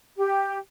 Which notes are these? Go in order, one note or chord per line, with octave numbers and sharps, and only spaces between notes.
G4